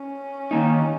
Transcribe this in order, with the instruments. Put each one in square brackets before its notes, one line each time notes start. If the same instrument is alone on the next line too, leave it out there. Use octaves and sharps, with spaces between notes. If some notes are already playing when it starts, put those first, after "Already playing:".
Already playing: [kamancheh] C#4
[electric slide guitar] D#3 A#3 D#4